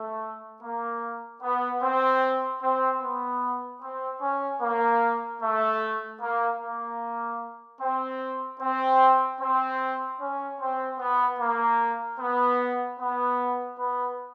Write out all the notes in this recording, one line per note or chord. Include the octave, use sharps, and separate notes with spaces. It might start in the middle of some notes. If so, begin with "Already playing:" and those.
Already playing: A3
A#3
B3
C4
C4
B3
C4
C#4
A#3
A3
A#3
A#3
C4
C4
C4
C#4
C4
B3
A#3
B3
B3
B3